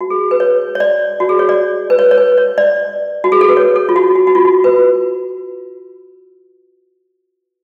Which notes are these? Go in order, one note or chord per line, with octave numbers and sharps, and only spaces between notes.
F#4
G#4
B4
C#5
C#5
D5
F#4
G#4
C#5
D5
B4
C#5
C#5
B4
C#5
D5
F#4
G#4
A4
B4
C#5
A4
F4
F#4
F#4
F#4
F4
F#4
B4